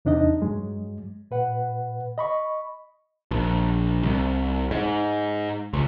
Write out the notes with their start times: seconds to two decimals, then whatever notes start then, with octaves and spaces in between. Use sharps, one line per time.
0.05 E2 C3 D4 D#4 D#5
0.42 G2 F#3 G#3
1.31 A#2 B4 F#5
2.18 D#5 B5 C#6
3.31 A#1
4.03 C2
4.71 G#2
5.73 C#2